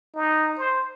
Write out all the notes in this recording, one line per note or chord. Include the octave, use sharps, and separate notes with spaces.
D#4
C5